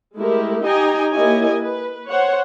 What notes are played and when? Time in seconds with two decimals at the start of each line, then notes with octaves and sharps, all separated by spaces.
0.15 G#3 A3 E4 G4 A#4
0.63 D#4 G4 D#5 G5 G#5 A#5
1.11 A#3 E4 G4 C#5 D#5 G#5
1.58 B4
2.09 C5 C#5 F#5